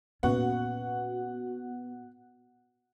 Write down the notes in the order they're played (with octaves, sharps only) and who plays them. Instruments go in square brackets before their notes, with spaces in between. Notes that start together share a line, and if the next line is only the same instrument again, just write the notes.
[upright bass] A#2 C#4 [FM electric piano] B3 F#4 [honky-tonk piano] F#5